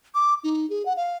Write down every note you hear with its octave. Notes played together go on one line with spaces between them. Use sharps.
D6
D#4
G#4
F#5
F5